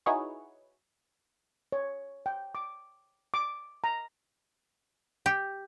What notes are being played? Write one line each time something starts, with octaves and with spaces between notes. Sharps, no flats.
D#4 E4 F#4 G#4 B4 C#5
C#5
G5
D6
D6
A#5
G4